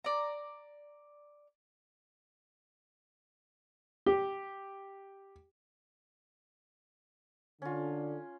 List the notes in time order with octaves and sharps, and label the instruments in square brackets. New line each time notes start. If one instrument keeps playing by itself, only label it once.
[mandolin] D5 A#5
[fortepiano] G4
[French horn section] D3 [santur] C#4 F4